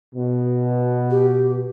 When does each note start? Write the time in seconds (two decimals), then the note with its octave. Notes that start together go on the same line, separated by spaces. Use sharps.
0.14 B2
1.10 G4